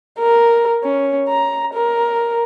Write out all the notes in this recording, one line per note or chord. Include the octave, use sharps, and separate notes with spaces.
A#4
C#4
A#5
A#4